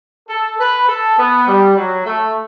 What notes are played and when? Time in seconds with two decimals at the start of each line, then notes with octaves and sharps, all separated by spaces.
0.29 A4
0.59 B4
0.89 A4
1.18 B3
1.47 G3
1.77 F#3
2.06 A3